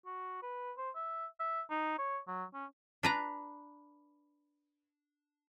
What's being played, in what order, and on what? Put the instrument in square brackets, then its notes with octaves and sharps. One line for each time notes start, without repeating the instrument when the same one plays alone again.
[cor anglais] F#4
B4
C5
E5
E5
D#4
C#5
F#3
C#4
[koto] D4 B4 A#5